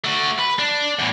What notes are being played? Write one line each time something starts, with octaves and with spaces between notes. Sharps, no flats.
A3 F#4
B4
D4
E2 A2